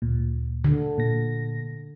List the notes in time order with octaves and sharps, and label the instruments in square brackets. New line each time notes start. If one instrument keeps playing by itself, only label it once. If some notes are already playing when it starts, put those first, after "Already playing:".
[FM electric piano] D2 A#2
[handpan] D3
[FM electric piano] A#2 A#6